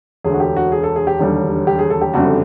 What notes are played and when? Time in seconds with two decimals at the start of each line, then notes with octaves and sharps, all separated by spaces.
0.24 E1 D2 D3 G#4
0.34 F#4
0.40 G4
0.57 F#4
0.72 G#4
0.83 A4
0.96 G#4
1.07 G4
1.20 E1 D#2 D3 G3
1.67 G4
1.79 G#4
1.90 A4
2.01 G4
2.14 F#1 F2 D3 G3 F#4